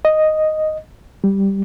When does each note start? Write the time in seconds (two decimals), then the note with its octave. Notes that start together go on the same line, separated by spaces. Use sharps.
0.05 D#5
1.24 G3